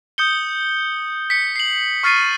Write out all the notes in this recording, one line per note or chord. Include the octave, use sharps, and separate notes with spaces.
D#6 G6 C#7 G7
B6 C#7
C7 F#7
C#6 F6 A6 C7 D#7